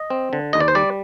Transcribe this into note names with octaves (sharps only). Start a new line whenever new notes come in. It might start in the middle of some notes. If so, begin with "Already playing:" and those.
Already playing: D#5
C4
D3
D#2 D#5
D5
C5
G3 D5